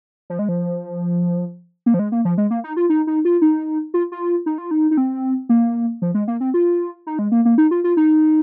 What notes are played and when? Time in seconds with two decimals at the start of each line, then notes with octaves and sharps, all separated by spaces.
0.30 F3
0.39 G#3
0.49 F3
1.86 A#3
1.94 F3
1.99 G#3
2.12 A#3
2.25 F3
2.38 G#3
2.51 A#3
2.64 D#4
2.77 F4
2.90 D#4
3.07 D#4
3.25 F4
3.42 D#4
3.94 F4
4.12 F4
4.46 D#4
4.58 F4
4.71 D#4
4.91 D#4
4.97 C4
5.49 A#3
6.02 F3
6.14 G#3
6.28 A#3
6.41 C4
6.54 F4
7.07 D#4
7.19 G#3
7.32 A#3
7.45 A#3
7.58 D#4
7.71 F4
7.84 F4
7.97 D#4